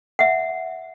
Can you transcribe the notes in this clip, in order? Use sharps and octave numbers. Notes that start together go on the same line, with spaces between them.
E5 F#5